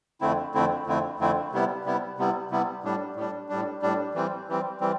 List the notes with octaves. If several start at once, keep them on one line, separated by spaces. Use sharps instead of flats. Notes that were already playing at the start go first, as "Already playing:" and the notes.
F2 D3 A3 C4 E4
F2 D3 A3 C4 E4
F2 D3 A3 C4 E4
F2 D3 A3 C4 E4
C3 G3 B3 E4
C3 G3 B3 E4
C3 G3 B3 E4
C3 G3 B3 E4
A2 G3 D4
A2 G3 D4
A2 G3 D4
A2 G3 D4
E3 G3 C4
E3 G3 C4
E3 G3 C4